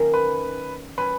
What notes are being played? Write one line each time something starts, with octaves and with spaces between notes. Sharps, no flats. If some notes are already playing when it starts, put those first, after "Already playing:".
Already playing: D#3 F#3 A#3 C#4
B4
F#3 C#4 B4